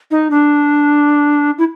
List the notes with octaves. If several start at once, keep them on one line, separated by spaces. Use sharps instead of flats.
D#4
D4
E4